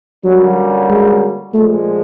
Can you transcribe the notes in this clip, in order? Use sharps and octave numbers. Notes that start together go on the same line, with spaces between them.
D3 F#3 G3 A#3 C#4 F#4
G#3
A#2 F3 G#3 A3